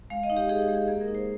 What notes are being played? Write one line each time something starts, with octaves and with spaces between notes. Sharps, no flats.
G#3 F5
D#5
D#4
G4
D#4 G#4
G#4
G#3
G#4
A#3 G#4
A#4
D#4
C5